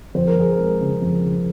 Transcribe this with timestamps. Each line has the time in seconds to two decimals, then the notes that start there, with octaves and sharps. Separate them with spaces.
0.15 F2 C5
0.27 A#4
0.36 F2 G#4
0.52 A#4
0.58 G#3
0.81 C#3
1.02 F2
1.24 C#3